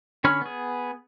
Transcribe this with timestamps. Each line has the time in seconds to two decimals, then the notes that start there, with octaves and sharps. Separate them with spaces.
0.24 D3 C#4 C#5 B5 F6
0.41 B3 G#4